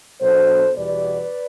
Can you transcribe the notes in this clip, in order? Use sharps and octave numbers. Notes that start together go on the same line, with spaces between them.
B2 F#3 B3 D4 A4 C5
E2 B2 G3 B4 D5